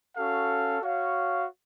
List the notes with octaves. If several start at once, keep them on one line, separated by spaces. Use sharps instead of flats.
C#4 F#4 A4 F5
F#4 C#5 F5